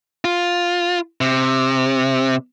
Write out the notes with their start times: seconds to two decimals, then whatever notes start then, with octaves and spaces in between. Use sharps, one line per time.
0.25 F4
1.21 C3